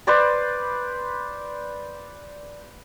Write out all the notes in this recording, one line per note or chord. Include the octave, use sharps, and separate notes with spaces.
B4 C5 D5 B5